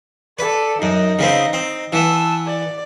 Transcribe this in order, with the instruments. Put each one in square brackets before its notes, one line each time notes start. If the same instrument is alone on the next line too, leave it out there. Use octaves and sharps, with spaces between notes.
[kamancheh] A4 D5 [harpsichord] B4
[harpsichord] F#2 [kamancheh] D#4 D#5
[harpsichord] C#3 B3 C4
C4
[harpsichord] E3 B3 [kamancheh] A5 E6
[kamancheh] D5